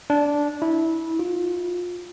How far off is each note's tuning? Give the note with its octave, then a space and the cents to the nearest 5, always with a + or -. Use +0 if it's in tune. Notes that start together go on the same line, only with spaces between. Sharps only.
D4 -10
E4 -20
F4 +25